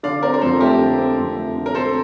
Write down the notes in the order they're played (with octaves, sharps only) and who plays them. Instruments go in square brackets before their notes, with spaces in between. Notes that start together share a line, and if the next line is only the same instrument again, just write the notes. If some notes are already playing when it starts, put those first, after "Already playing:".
[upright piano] D3 [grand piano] D5 F5
[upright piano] C4 [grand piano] A#4 D5
[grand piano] A#4
[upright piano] F2 [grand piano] A4 C5
[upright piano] A3 [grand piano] G4 A#4
[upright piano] D3
C4
F2
A3
D3
[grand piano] A#4
[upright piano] C4 [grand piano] A4 C5